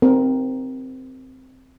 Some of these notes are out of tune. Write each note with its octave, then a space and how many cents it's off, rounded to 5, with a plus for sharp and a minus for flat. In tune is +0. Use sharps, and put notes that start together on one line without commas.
C4 -5 A#4 +15